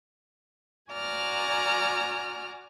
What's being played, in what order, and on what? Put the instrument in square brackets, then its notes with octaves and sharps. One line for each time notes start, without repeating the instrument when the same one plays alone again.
[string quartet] F#4 D5 G#5 A#5 F6